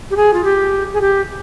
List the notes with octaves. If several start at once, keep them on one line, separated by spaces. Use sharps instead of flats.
G4
G#4
F4
G4
G#4
G4